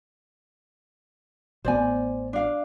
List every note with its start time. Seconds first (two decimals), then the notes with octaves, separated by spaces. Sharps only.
1.65 A1 B3 C5 D5 G#5
2.33 D4 F5